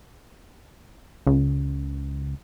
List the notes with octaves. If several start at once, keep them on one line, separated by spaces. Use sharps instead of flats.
C#2